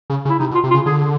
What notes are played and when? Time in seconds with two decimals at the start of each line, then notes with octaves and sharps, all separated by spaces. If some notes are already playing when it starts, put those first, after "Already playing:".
0.10 C#3
0.25 C#3
0.30 E4
0.39 C3 D#4
0.51 B2
0.55 F4
0.64 C3
0.70 F4
0.74 C#3
0.86 D3 G#4